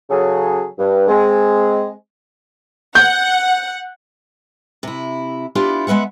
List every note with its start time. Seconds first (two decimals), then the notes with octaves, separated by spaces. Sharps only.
0.10 C#3 F#3 G#4 A4
0.78 G2
1.08 G#3 C4
2.95 F#5 G6
4.83 C3 E4
5.55 B3 D4 E4 F4 G4
5.87 G#3 B3 B4 E5 F#5